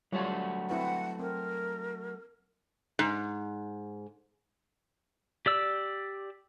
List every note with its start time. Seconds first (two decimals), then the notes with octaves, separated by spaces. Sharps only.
0.12 F#3 G3 A3 F4 F#4 C#5
0.70 C4 E4 B4 F#5
1.20 C4 A#4
2.99 G#2
5.46 G4 D5 E6